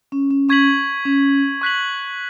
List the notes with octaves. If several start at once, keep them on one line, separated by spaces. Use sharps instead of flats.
C#4
C#4
C#4 C#6 G#6 B6 F#7
C#4
C#6 F#6 B6 F#7